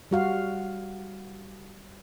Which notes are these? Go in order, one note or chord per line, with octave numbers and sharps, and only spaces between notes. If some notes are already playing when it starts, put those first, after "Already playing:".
G3 F#4 F5